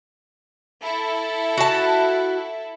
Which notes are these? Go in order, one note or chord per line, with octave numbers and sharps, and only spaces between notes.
E4 A4
F#4 A5